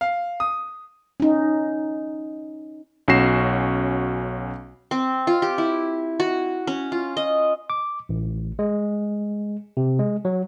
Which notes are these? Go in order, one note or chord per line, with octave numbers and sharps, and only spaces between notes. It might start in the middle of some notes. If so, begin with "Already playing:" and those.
F5
D#6
C#4 D#4
B1 C#4 F#4 A#6 C7 E7
C4
F4
G4
E4
F#4
C#4
F4
D#5
D6
A1
G#3
C3
G#3
F#3